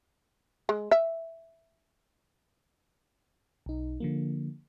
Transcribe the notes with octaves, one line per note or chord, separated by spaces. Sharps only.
G#3
E5
B1 D#4
D3 F3 A#3